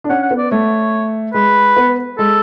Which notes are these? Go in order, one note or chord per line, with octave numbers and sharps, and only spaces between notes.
D4
C#4 F#5
F#5
B3
D5
A3 C#5
G#3 B4
B3
G#3 A4